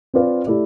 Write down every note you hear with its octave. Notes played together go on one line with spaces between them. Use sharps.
C4 F4 B4 D5 F5
A3 E4 G4 D5